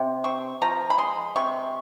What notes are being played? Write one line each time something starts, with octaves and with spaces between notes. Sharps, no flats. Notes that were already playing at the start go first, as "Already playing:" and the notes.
Already playing: C3
C4 C#6
F3 A#5
B5
G#3 C6
C3 C#6